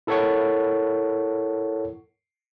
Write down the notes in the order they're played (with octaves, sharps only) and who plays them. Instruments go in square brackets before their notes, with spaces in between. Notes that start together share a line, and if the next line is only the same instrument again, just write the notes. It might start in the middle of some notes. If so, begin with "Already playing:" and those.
[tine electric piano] E4 A4 A#4 C#5 F#5 C#6